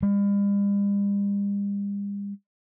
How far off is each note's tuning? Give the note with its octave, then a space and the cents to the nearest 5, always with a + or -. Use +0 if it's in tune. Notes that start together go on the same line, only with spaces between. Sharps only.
G3 +45